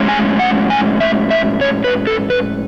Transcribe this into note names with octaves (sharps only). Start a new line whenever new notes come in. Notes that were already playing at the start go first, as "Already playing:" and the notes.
Already playing: A2 G#3 C#4
G#5
F#5
G#5
E5
E5
C#5
B4
A4
B4